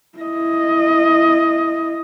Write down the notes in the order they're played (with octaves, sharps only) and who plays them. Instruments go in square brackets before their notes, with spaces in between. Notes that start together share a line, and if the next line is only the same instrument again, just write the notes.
[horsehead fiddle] E4 D#5